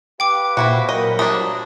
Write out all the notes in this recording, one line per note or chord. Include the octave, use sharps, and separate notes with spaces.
G4 B4 F5 G5 D6
A#2 C4 E4 F#4
G2 F#3 A#4 D#5 B5
F3 A#3 D4 D#6